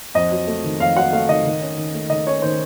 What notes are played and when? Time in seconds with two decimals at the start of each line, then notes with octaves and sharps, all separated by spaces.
0.15 F2 D#5
0.31 F#3
0.47 A3
0.64 D#3
0.79 F2 F5
0.96 F#3 F#5
1.12 A3 F5
1.29 D#3 D#5
1.45 D#3
1.62 C#4
1.77 D#3
1.94 A3
2.10 D#3 D#5
2.27 C#4 C#5
2.42 D#3 C5